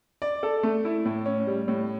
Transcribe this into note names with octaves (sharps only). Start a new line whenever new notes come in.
D5
A4
A3
E4
A2
C#4
G3
A2